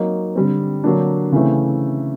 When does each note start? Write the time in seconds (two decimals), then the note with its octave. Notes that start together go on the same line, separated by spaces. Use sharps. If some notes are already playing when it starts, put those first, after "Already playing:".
Already playing: F#3 A#3 D#4
0.35 D3 G3 C4
0.84 D3 F#3 A#3 D4
1.32 C#3 E3 A3 C4